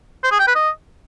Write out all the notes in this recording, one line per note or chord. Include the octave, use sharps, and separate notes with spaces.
C5
G#4
G5
B4
D#5